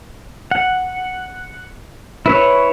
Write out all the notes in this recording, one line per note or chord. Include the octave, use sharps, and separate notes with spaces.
F#5
E4 B4 C#5